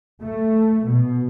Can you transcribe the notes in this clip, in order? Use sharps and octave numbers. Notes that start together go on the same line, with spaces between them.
A3
B2